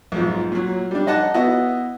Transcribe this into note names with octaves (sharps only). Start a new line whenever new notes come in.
B1 G#2 F3
A#2 F#3
G3 D4
D#4 D#5 F#5 A5
B3 E4 F#4 D#5